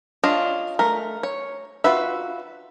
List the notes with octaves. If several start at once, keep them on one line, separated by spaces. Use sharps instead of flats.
D4 F4 C#5 D#5
A3 A#4
C#5
F4 F#4 B4 E5